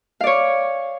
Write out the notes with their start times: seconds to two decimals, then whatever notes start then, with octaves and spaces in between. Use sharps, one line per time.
0.21 F5
0.24 D5
0.27 C#5